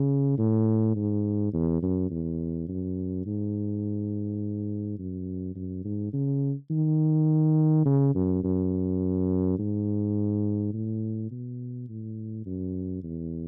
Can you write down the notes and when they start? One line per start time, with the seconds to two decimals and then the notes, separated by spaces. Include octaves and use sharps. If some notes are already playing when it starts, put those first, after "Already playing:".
Already playing: C#3
0.38 A2
0.96 G#2
1.53 E2
1.82 F#2
2.10 E2
2.68 F#2
3.26 G#2
4.98 F#2
5.55 F#2
5.84 G#2
6.13 C#3
6.70 D#3
7.86 C#3
8.15 F#2
8.44 F#2
9.58 G#2
10.73 A2
11.31 B2
11.88 A2
12.46 F#2
13.03 E2